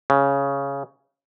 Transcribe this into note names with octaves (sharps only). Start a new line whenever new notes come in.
C#3